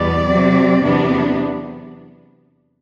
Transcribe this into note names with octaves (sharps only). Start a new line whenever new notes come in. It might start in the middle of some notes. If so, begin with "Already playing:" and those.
Already playing: E2 B2 G3 B3 D5
C3 F#3 C4
E2 C3 F#3 B3 D4